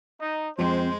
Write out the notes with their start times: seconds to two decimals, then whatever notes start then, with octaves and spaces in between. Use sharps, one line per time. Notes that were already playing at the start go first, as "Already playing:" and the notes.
0.20 D#4
0.58 F2 G#3 C4 C5